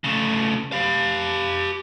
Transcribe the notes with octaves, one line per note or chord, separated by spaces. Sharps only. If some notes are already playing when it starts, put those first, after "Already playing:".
C#3 A3
G4 F5